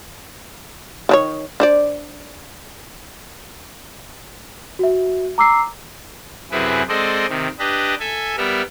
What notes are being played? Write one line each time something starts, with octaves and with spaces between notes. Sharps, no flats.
D#3 D4 C#5
D4 C5 D5
F#4 E5
A#5 D6 E6 C7
F#2 C3 E4 G#4 B4
G#3 C4 A4 C5 D5 D#5
C3 D#3
D4 G4 B4 D#5
A4 E5 G#5
G3 B3 A#4 E5